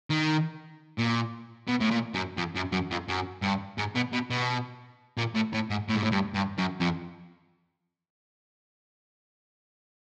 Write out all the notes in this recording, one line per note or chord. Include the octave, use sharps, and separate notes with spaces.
D#3
A#2
B2
A2
A#2
F#2
F2
F#2
F#2
F2
F#2
G2
G#2
B2
B2
B2
A#2
A2
A2
G#2
A2
G#2
A2
G2
G2
F#2
F2